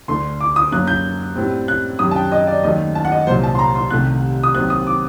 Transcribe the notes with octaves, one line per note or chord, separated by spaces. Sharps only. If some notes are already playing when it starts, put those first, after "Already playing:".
D2 D3 A3 C6
D6
D#6
F#2 F#3 A#3 F#6
G6
A2 G3 C4
F#6
F#2 D#3 G3 D#6
A5
G5
D#5
D5
D#2 D#3 F#3 A3 D#5
A5
F#5
D#5
C2 A#2 F#3 C5
A5
C6
A#5
C6
C2 C3 D#3 A3 F#6
D#6
D#2 D#3 F#3 C4 F#6
D#6
D6